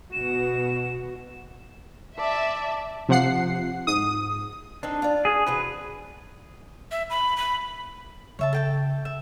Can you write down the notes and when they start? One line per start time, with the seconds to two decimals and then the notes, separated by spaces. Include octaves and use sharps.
0.13 B2 F#4 E7
2.18 D5 E5 A5
3.09 C3 F3 F#5 C7
3.87 G#2 D#6
4.83 C4 D4 D#4 A4
5.02 F4 D5
5.25 G#4
5.47 C3 E3 F#4 B4
6.91 E5
7.10 B5
7.37 B5
8.39 C#3 C#5 E5 A5
8.53 A4 G5 A5
9.05 E5